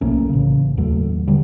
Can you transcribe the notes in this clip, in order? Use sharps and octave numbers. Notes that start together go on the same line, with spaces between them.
B1 A3 A#3 C#4
A1 C#3
D#2 F#3 A3
D3 G3